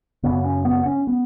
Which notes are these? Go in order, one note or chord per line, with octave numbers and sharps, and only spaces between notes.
F#2 C#3 B3
C#4
B3
C#4
B3